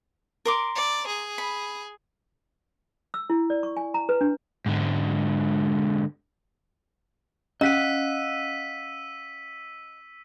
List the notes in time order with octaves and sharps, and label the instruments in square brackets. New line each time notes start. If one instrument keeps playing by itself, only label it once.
[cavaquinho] A#4 C6 D6
[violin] D5
G#4
[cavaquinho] B5
[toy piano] E6
E4
D5
C#6
G#5
A#5
B4
D4
[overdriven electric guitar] G#2 D3
[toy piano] C#4 [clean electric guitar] D#5 F5 F#5 [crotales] E6 B6 D#7